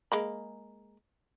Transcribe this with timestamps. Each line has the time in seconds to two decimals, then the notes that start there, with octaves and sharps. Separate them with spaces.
0.12 G#3 A#3 B5